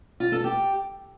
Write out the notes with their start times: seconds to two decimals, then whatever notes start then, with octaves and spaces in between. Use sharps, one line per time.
0.20 F4
0.32 A4
0.44 G4